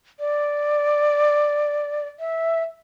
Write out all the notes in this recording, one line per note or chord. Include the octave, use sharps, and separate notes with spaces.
D5
E5